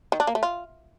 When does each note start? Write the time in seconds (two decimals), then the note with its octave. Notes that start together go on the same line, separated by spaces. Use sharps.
0.12 D#3
0.20 D4
0.27 A#3
0.35 A3
0.43 F4